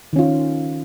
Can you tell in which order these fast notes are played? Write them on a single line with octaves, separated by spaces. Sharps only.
D#3 C#4 F4